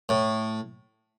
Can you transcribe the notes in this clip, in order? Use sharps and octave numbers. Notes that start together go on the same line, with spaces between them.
A2